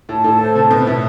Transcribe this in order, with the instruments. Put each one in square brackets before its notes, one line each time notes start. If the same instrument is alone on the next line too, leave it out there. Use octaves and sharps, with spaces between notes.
[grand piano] A2 [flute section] A5
[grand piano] A2 [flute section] A4
[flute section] C5
[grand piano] C3 [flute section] A5
[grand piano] B2 [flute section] B4
[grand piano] A2 [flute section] E5